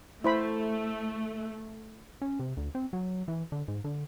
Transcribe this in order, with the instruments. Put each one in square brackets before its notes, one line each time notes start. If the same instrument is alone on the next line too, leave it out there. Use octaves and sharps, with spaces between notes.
[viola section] A3 [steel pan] E4 C5 B5
[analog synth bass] C#4
C3
D2
C4
F#3
E3
D3
G#2
D3